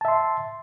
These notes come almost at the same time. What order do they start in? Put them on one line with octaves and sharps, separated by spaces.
A5 E5 C6